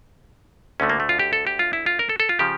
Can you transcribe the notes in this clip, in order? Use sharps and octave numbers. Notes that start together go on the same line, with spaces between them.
D2 D3 A3 C#4
A#3
A3
F4
G4
A4
G4
F4
E4
F4
A#4
A4
A4
F4
C#3 F3 G4